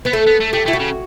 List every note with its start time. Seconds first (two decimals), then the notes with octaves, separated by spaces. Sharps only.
0.05 B3 B4
0.13 A3 A4
0.27 B3
0.41 A3
0.53 A3 G4
0.66 A3 E4
0.73 F#4
0.80 C#3